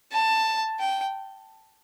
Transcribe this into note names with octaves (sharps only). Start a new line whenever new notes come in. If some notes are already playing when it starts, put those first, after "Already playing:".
A5
G5